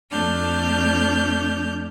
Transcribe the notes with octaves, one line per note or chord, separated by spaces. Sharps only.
F2 A3 D4 F6 G6